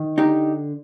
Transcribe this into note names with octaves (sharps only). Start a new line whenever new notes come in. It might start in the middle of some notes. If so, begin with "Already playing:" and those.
Already playing: D#3
D3 D#4 G4